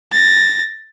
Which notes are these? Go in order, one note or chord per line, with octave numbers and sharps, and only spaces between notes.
A6 A#6